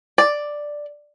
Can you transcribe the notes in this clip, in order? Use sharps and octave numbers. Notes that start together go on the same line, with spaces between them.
D5